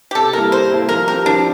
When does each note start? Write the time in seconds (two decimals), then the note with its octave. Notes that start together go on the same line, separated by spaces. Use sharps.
0.11 G4
0.15 C3 A4
0.33 G3 A#3 E4 A4 A#4
0.51 C3 C5
0.70 G3 A#3 E4 A4
0.89 F3 A#4
1.07 C4 G4 A#4
1.26 F3 D4